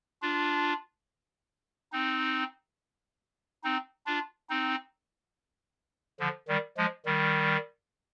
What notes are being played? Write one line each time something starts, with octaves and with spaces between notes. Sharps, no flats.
D4 F4
C4 D#4
C4 D#4
D4 F4
C4 D#4
D3 F3
D#3 G3
F3 G#3
D#3 G3